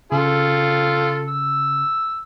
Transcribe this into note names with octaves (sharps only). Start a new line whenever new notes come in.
C#3 F4 A4
E6